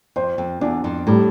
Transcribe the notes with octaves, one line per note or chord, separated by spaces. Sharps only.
F2 C5
F2
E2 D4
F2
A2 G3